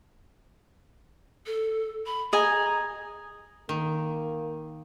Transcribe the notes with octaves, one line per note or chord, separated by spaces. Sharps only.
A4
B5
G#4 D#5 G#5 A#5
D#3 A#3